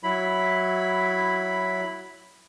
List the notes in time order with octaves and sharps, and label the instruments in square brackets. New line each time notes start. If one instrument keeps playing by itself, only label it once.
[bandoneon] F#3 E4 B5